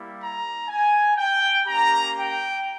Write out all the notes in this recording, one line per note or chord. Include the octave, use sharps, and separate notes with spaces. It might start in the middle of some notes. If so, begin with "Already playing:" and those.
Already playing: G3 A#3 E4
A#5
G#5
G5
A#3 C#4 G4 A#5
G5